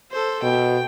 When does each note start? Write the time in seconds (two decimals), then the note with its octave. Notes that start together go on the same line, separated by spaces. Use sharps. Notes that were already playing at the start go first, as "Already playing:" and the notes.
0.11 A4 C5
0.43 B2 G5